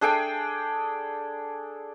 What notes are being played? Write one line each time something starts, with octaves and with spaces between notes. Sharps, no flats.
D4 G#4 A4 G5